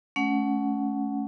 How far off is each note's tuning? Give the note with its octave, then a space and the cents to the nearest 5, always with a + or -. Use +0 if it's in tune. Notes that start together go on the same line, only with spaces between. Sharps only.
A3 -30 C#4 +10 F#5 +0